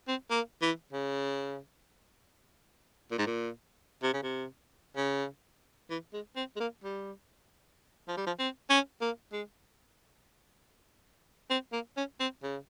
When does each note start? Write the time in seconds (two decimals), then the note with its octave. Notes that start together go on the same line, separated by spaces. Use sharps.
0.08 C4
0.31 A#3
0.62 E3
0.93 C#3
3.11 A#2
3.19 G#2
3.26 A#2
4.03 C3
4.13 C#3
4.23 C3
4.97 C#3
5.90 E3
6.13 G#3
6.36 C4
6.56 G#3
6.60 A#3
6.84 G3
8.08 F3
8.17 G3
8.27 F3
8.39 C4
8.70 C#4
9.01 A#3
9.33 G#3
11.50 C4
11.73 A#3
11.97 C#4
12.20 C4
12.43 C#3